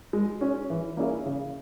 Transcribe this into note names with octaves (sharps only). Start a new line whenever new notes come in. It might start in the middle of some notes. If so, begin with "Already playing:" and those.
G#3
C#4 G#4
E3
A#3 C#4 E4 G#4
C#3